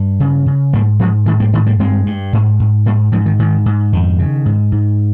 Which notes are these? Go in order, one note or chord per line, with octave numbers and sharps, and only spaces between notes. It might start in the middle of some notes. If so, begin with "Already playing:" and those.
Already playing: G2
C#3
C#3
G#2 G3 A#3
G#2 F3 G#3
G#2 D#3 G3
G3 A#3
G#2 D#3
G3 A#3
G2 G#3 C4
G2
G#2
G#2
G#2 G3 A#3
G#2 F3
D#3
G#2 D#3
G#2
F2 D#3
C#3
G#2
G#2